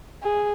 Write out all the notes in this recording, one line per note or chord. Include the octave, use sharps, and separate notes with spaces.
G#4